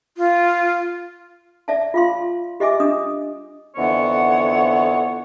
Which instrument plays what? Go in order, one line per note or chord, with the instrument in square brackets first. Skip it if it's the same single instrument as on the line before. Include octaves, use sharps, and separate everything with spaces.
[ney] F4
[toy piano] D5 E5 A5
F4 F5 C6
G4 D#5 E5 G#5 D6
D4 D#6
[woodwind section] F2 D3 E3 B3 C#5 F#5